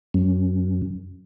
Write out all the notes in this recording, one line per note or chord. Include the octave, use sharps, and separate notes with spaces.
F#2